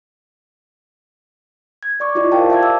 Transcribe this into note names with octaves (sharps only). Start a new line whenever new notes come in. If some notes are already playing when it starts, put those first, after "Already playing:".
G#6
D5 C#6 D6
E4 F4 G4 D5 D#5
A#4 C5 F5 G5 A5
E5 A5 D6 G#6
E6